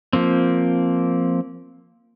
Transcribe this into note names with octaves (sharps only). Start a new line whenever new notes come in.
F3 A#3 C4